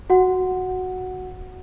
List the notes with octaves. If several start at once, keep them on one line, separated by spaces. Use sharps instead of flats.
F#4 F#5